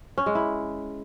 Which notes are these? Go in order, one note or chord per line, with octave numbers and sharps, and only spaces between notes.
C#4
G#3
E4